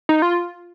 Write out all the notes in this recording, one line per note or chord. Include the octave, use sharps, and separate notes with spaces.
D#4
F4